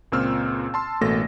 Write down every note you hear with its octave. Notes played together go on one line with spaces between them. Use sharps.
C#2 A#2 C4 E6 F6
A5 C6 E6
A1 B2 A3 A#3 A4 A#6